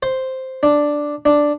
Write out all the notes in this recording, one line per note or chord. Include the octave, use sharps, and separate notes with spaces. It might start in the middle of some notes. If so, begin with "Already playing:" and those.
C5
D4
D4